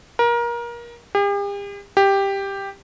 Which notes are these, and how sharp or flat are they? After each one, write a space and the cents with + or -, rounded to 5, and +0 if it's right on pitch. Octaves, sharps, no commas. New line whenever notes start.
A#4 +25
G4 +45
G4 +5